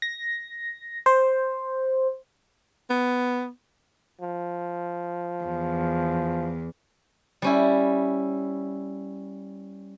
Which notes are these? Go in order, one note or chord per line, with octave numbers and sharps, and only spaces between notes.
A#6
C5
B3
F3
E2
G3 C#4 E4